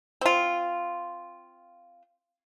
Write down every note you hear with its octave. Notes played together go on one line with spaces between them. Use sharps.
C4 F4